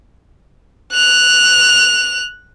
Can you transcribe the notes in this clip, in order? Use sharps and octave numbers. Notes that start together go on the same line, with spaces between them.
F#6 F7